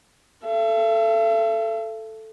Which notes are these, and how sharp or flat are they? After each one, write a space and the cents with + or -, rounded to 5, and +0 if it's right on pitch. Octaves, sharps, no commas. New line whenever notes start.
A4 +0 E5 +45